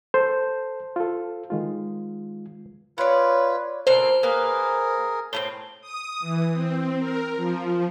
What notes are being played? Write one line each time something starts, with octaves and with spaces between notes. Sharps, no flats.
A4 C5 A5
F4 A4
D#3 G#3 F4
F4 B4 C#5 D5
B2 D3 C4 A#4 C5
A#3 G#4 A#4 B4
A2 A3 C4 G7
D#6
E3
C4
A#4
F3